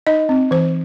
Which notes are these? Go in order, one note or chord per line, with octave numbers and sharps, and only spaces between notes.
D#4 D#5
C4
E3 C5